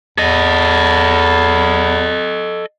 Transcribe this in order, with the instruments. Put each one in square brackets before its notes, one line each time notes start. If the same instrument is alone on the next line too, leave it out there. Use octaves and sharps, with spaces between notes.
[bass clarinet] E2 [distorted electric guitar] A4 D#5